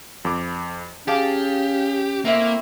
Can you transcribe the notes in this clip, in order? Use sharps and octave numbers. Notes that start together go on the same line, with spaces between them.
F2 D6
C#4 G4 G#4 F5 A5
A3 A#3 C4 E4